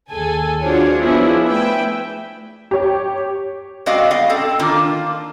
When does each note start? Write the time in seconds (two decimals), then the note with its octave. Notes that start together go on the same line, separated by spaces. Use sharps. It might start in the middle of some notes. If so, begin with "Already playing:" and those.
0.11 D#2 G#4 A4 G#5
0.62 D4 F4 F#4 G#4 C5 C#5
0.99 F3 B3 D4 E4 G#4
1.49 A3 B4 E5 G5
2.71 G4 C#5
3.86 G#3 C4 F#4 D5 D#5 F5
4.11 B3 D#5 F5
4.30 C4 A4
4.59 D#3 A#3 D4 F4